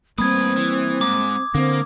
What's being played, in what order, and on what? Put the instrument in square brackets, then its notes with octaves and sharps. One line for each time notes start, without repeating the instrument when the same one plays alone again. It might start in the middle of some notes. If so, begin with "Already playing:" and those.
[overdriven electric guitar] A2 B4 [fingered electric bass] G3 A#3 [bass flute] C4 [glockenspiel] D#6 G#6
[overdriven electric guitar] E3
[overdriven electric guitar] G#2 [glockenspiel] D6
[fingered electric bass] D3 [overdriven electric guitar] A#3 [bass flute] C4